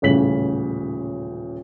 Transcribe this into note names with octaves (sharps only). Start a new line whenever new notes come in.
D#1 A1 C#3 B6 F#7